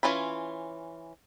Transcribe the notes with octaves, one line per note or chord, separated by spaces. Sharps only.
E3 C#4 F4 B5